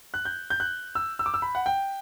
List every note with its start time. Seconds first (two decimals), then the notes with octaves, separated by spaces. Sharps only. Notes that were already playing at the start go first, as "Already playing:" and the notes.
0.14 F#6
0.25 G6
0.50 G6
0.60 F#6
0.95 E6
1.19 E6
1.26 D6
1.34 E6
1.42 B5
1.55 F#5
1.66 G5